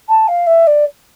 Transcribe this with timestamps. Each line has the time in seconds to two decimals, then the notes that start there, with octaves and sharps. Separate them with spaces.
0.08 A5
0.28 F5
0.46 E5
0.67 D5